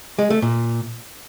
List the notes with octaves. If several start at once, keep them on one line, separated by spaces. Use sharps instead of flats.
G#3
A3
A#2